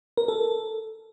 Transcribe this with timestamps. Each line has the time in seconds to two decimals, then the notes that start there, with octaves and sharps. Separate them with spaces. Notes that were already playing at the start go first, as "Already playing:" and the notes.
0.17 A#4
0.28 A4